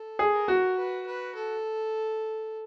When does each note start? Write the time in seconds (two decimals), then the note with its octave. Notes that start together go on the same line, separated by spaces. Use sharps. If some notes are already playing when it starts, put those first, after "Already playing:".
Already playing: A4
0.19 G#4
0.33 A#4
0.48 F#4
0.78 B4
1.06 B4
1.36 A4